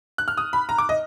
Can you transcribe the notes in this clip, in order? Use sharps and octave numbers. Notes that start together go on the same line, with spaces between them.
F#6
F6
D#6
B5
A#5
D6
D#5